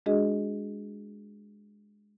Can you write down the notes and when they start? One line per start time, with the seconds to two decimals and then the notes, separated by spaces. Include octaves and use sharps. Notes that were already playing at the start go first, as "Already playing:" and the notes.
0.06 G#3 D4 F#4 G#4 D#5